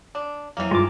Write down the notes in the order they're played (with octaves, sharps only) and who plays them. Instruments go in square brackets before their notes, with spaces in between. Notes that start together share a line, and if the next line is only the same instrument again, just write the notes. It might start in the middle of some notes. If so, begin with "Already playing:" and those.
[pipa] D4
[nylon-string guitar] F2 F#3 E5 [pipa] E3 A#3
[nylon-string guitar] G2 D#3 A5 [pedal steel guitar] G#3 D6 [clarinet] F4